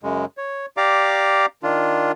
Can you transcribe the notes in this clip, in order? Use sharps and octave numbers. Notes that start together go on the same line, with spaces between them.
F#2 C#3 G#3
C#5
G4 D5 F5 A#5 D6
D#3 D4 F4